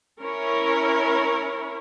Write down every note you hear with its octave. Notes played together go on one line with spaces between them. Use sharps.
C#4 E4 A#4 C#5